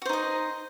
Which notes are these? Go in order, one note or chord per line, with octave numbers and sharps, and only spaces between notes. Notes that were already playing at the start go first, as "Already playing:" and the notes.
D#4 F#4 C5 D#5